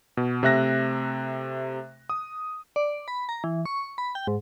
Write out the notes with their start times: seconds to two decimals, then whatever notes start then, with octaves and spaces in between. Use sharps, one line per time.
0.17 B2
0.43 C3 A3 E5 F#6 A#6
2.10 D#6
2.76 D5
3.08 B5
3.29 A#5
3.44 E3
3.66 C#6
3.98 B5
4.15 G5
4.27 G#2